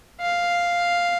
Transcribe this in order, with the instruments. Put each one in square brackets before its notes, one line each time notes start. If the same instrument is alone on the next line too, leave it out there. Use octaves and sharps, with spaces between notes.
[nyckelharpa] F5